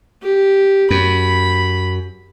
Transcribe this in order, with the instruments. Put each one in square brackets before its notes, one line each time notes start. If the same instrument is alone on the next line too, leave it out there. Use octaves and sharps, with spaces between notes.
[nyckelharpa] G4
[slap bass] F#2 [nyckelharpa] B5